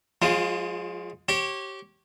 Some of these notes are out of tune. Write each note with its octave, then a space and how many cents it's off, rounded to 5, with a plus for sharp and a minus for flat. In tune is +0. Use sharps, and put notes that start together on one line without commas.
F3 +45 G#3 +0 F4 +0
G4 -25 C#5 -30